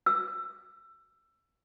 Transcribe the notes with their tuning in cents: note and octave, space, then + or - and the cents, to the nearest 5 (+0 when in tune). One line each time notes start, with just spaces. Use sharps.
E6 +20